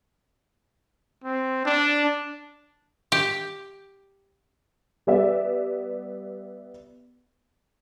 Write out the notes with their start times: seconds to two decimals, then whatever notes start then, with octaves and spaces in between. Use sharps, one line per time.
1.24 C4
1.65 D4
3.12 G4
5.07 G3 B3 D5 E5